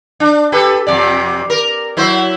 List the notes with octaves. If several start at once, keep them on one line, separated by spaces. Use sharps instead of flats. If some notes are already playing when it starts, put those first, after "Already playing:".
D4
G4 A4 B4
F2 C3 D5
A#4
F#3 E4 C5